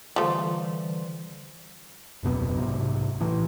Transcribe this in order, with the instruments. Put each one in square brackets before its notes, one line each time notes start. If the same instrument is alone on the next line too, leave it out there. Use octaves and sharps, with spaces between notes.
[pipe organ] D3 E3 G3 [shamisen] F3 A3 [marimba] C5 F5 C6
[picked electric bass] D1 F2 B2 B3
B1 G#2 C3
A2 E3